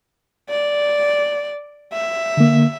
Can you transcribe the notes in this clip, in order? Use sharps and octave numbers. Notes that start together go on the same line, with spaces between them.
D5
E5
D3 A#3